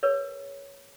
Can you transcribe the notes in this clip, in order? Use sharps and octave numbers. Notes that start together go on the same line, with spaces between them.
G#4 A#4 B4 C#5